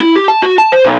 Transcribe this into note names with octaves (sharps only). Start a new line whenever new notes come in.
E4
G4
A5
F#4
A5
C5
B1